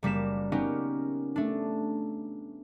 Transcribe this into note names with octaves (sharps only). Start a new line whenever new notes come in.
F#1 G3 A#3 B6 E7
B3 C#4 D#4 G4 A#4
A3 D4